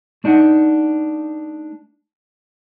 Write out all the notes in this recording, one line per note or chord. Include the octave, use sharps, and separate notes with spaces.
A3 D4 D#4 F5 F#5